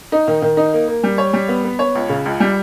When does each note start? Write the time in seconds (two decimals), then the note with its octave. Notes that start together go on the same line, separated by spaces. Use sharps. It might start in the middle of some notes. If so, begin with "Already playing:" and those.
0.12 D#4
0.27 D#3
0.42 D#3
0.57 D#4
0.73 A#3
0.88 A#3
1.03 G3
1.18 C#5
1.33 G3
1.48 B3
1.64 B3
1.79 C#5
1.95 C#2
2.09 C#3
2.25 C#2
2.40 G3